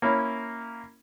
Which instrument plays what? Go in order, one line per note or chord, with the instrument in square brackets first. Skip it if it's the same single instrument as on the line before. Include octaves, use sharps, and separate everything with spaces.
[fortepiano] A#3 C#4 E4